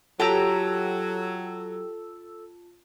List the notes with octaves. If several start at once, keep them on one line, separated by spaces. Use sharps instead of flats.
F#3 F4 G4 A4 A5 A#5 E6